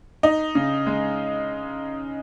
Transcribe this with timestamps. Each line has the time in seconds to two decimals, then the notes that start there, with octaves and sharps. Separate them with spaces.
0.23 D#4
0.55 C#3
0.87 G#3